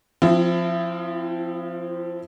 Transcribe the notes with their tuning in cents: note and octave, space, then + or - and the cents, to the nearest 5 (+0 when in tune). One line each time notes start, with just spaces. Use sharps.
F3 +0 C4 +0 E4 +35